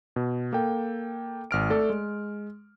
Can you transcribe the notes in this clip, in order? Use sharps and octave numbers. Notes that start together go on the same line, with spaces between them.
B2
A#3 A4 G5
G#1 F6 D7
A3 A4 D5
G#3